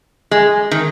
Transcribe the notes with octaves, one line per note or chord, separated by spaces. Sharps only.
G#3
D#3